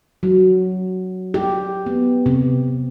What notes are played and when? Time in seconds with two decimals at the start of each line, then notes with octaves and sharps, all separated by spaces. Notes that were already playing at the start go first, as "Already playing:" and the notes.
0.23 F#3
1.34 G4
1.86 B3
2.26 C3